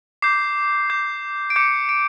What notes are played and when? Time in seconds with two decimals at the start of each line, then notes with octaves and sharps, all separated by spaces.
0.22 D6 G6 C7
0.90 D6 G6
1.50 D7
1.56 D6 G6 C#7
1.89 D7